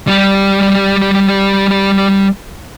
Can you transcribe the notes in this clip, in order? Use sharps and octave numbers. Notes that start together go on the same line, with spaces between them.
G3 G4